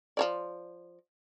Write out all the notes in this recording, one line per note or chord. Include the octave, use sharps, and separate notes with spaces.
F3 C#5 D5